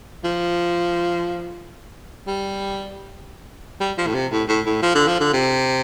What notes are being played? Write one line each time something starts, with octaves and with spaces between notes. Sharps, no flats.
F3
G3
G3
F3
A2
C3
A2
A2
A2
F3
D3
F3
D3
C3